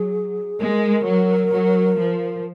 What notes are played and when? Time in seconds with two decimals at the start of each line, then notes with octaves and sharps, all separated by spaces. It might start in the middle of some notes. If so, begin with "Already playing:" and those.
Already playing: F#3 G#4
0.60 G#3 A#4
1.05 F#3
1.52 F#3
1.98 F3